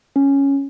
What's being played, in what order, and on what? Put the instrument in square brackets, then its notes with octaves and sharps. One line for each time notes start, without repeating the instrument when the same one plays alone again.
[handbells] C#4